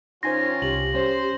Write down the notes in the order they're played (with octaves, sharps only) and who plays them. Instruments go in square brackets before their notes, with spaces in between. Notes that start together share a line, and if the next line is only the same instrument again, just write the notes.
[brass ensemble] D#3 C#4 F4 [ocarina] D#4 [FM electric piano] C5 G#5 C6 [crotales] A#6
[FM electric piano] C2 [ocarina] G4 [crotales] F#7
[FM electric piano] G3 C#4 [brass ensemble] C5